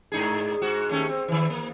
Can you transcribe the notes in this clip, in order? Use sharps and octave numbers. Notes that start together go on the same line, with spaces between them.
G#2 D#4 G#4
G#2 F#4
D#2 A3 C#4
C4
D#3 E3
A#3